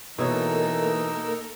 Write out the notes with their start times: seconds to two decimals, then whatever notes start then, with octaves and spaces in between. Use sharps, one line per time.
0.18 B2 E3 A#3 D#4 A4 A#4 C#5 E6